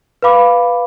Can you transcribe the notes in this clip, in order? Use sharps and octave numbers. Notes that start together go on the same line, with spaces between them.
B4 F5 B5 D6